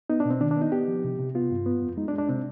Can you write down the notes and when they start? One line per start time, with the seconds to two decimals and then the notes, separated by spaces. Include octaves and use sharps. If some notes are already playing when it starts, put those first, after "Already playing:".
0.10 B3 D#4
0.20 D4
0.25 B2
0.30 C4
0.41 D#3 D4
0.51 D4
0.57 B3 D#4
0.72 B3 G4
0.88 F3
1.04 C3
1.19 C3
1.35 B3 F4
1.51 G2
1.66 B3
1.82 F2
1.97 G#3 D#4
2.08 D4
2.13 G#3
2.18 D4
2.29 C3 C4